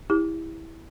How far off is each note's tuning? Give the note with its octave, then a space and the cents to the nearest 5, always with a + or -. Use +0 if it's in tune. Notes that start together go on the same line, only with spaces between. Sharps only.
E4 -10 G4 +35